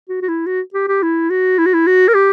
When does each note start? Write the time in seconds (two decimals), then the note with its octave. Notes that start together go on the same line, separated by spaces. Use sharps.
0.09 F#4
0.22 F#4
0.28 E4
0.46 F#4
0.74 G4
0.88 G4
1.03 E4
1.30 F#4
1.58 E4
1.66 F#4
1.74 E4
1.86 F#4
2.08 A#4
2.14 G4